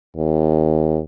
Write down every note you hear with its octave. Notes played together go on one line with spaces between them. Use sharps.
D#2